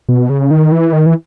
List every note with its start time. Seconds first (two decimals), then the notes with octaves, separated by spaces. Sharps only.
0.09 B2
0.30 C#3
0.51 D#3
0.72 E3
0.93 D#3
1.06 E3